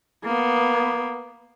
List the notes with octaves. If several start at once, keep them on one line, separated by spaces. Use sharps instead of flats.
A#3 B3